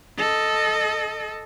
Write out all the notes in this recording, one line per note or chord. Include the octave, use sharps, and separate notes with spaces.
A4 D#5